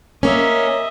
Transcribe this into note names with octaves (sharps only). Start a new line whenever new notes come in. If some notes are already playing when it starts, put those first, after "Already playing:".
A#3 C#4 D#5 E5